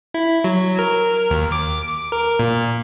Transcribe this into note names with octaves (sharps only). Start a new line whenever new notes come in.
E4
F#3
A#4
D#2
D6
A#4
A#2